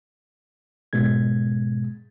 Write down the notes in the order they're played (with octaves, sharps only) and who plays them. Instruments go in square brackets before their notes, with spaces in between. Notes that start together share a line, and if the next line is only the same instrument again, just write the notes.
[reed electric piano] G#2 B2 G#3 G#6